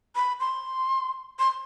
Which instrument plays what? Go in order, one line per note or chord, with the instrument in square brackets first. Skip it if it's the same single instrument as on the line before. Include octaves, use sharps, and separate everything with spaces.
[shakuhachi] B5
C6
C6